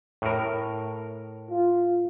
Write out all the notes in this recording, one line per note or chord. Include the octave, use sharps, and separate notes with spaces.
A2 A#4
F4